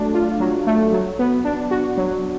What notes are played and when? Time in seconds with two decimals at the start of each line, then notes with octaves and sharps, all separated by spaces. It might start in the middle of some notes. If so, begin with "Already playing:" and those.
Already playing: F#3 A3 D4
0.14 F4
0.40 F#3
0.67 A3
0.93 F#3
1.19 B3
1.45 D4
1.71 F#4
1.98 F#3